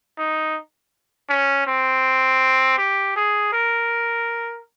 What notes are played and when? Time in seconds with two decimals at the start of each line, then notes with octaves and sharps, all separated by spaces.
0.18 D#4
1.29 C#4
1.67 C4
2.78 G4
3.16 G#4
3.53 A#4